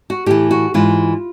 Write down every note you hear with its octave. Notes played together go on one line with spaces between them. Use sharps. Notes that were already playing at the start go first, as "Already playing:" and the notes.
F#4
A2 E3 G4
F#4
G#2 E3 F4